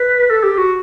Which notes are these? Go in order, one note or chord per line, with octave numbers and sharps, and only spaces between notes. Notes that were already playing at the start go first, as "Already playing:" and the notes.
Already playing: B4
A4
G4
F#4